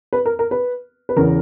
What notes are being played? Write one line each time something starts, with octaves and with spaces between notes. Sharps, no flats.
B4
A#4
A#4
B4
B4
E2 C#3 E3 A#4